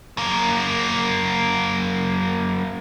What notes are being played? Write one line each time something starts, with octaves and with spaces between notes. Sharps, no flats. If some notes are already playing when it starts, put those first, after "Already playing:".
F#2 A#3